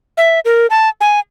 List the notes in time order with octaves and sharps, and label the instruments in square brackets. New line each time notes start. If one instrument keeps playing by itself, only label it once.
[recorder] E5
A#4
A5
G#5